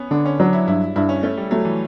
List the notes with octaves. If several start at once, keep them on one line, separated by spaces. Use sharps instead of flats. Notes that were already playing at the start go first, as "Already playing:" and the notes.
Already playing: B3 C#4
D3 D4
C#4
F#3 D4
E4
G2 E4
G2 E4
C#4
A3 C#4
G3
F#3 A3
E3